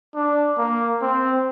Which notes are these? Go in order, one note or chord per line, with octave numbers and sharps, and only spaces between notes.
D4
A#3
C4